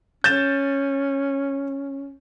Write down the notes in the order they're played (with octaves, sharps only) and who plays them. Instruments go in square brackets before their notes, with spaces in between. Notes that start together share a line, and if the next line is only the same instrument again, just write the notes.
[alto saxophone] C#4 [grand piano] G6 A6 E7